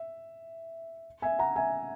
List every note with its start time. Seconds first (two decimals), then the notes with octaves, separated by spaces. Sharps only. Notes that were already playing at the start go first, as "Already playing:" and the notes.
Already playing: E5
1.22 E5 G#5
1.39 F#5 A#5
1.56 E5 G#5